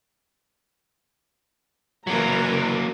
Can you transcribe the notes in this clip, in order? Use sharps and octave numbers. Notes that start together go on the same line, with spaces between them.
E3 F#3 A#3 A#4 A#5